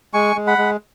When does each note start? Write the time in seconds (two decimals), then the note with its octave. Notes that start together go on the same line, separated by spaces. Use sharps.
0.14 G#3 G#5 C#6
0.36 G#3
0.47 F#5 B5
0.58 G#3